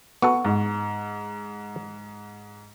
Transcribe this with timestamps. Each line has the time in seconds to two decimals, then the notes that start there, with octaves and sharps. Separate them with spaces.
0.22 B3 F#4 A4 C#6
0.45 G#2